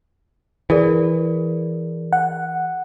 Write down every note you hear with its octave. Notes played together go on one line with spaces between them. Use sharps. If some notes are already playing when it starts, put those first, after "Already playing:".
E3 G#4 A#4 D5
F#5